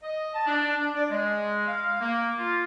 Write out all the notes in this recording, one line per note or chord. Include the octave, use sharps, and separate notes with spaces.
D#5
A5
D4
D4
D5
G#3
F5
A#3
F4